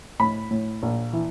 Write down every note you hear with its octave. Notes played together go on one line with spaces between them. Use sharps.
A2 B5
A2
A#1
E3